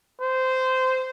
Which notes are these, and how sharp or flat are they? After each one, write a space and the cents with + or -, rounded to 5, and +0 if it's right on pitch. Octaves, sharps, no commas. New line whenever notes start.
C5 -15